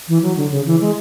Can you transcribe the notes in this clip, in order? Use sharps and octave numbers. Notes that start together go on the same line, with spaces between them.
E3
F#3
D3
C#3
E3
G#3